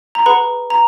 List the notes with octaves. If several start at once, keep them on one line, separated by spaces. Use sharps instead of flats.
A#5
G#4 B4 F#5 B5
A#5